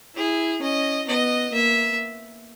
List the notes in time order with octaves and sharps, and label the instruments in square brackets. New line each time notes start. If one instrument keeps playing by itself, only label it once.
[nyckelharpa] E4 [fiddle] G#4
[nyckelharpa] C#4 [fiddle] D#5
[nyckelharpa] B3 [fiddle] D#5
[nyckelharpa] A#3 [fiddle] E5